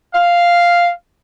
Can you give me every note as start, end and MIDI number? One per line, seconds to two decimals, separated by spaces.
0.13 0.88 77